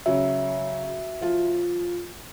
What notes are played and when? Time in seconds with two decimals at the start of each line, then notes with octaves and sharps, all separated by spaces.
0.06 C#3 F#3 F#4 E5
1.21 F3 F4